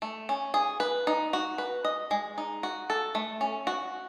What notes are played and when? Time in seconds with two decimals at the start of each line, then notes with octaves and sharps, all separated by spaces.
0.02 A3
0.29 C#4
0.54 G#4
0.80 B4
1.07 D#4
1.33 F#4
1.58 B4
1.85 D#5
2.11 G#3
2.38 D#4
2.63 F#4
2.90 A4
3.15 A3
3.41 C#4
3.67 F#4